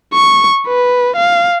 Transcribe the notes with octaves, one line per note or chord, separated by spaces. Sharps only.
C#6
B4
F5